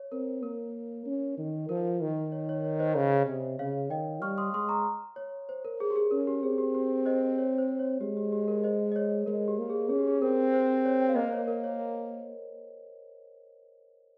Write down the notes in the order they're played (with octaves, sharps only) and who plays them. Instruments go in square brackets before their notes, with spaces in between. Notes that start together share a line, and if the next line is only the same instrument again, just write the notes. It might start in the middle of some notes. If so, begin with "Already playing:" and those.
Already playing: [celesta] C#5
[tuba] C4 [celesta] A#4
[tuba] A#3 [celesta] A#4
[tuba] C#4
D#3
[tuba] F3 [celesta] A#4
[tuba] D#3
[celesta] C#5
C#5
C#5
C5 D#5
[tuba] C#3
C3
[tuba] C#3 [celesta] C#5 F5
[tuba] D#3 [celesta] D#5 G5
[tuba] G3 [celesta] C#6 F6
[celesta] C6 D#6
[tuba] G#3 [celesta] C6 D#6
[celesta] A#5 C#6
C#5
C5
A#4
G#4
G4
G#4
[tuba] C#4 [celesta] A#4
[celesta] G4
[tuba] C4 [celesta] G#4
[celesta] G4
G4
C5 D#5
C#5
C5
C#5
[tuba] G#3 [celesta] G4
[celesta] G4
G4
A#4
C5 D#5
D#5
C#5
[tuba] G#3 [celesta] A#4
[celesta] G4
[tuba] A#3
[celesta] G#4
[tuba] C#4 [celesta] G#4
[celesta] G4
G#4
[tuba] C4 [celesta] A#4
[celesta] C5
C#5
G5
F5
[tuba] A#3 [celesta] C5 D#5
[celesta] C#5
A#4
C#5